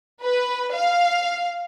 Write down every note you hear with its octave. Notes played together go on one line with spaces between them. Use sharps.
B4
F5